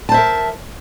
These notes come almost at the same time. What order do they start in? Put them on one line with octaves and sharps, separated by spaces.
A5 C5 E5 A#4